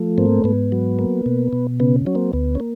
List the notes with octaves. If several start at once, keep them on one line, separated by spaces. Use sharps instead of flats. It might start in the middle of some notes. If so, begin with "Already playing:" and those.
Already playing: F3 A3
G#2 A#3 C4
G#2 B3
F#3
A#3
B2
B2
C#3 B3
F#3 C#4
A#3 C4
D2 B3
C#4
A#3